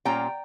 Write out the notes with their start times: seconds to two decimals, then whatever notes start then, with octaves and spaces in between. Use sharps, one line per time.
0.05 A#2 G3 C#4 F4 G5 A#5